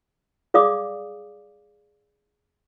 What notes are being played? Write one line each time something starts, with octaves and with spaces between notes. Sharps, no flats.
G#4 D5 F5 D6 D#6